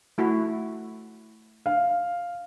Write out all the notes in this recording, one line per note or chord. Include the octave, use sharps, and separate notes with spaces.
A3 E4 F#4
F5